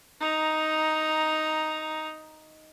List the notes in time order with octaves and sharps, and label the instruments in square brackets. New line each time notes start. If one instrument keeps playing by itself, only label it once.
[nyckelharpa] D#4 A#5